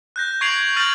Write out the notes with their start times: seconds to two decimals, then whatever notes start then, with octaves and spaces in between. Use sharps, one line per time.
0.16 F#6 G6 A#6
0.41 C#6 G#6 C7 D7 F7 F#7
0.77 F6 G6 A6 A#6 D#7 F#7